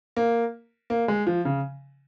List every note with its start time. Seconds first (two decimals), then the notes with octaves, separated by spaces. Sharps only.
0.16 A#3
0.90 A#3
1.08 G#3
1.27 F3
1.45 C#3